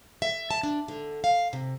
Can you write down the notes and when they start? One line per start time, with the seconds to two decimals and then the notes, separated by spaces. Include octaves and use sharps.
0.22 E5
0.51 A5
0.63 D4
0.88 D3
1.24 F5
1.53 C3